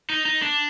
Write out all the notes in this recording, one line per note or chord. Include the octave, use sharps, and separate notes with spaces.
D#4
D#4
D4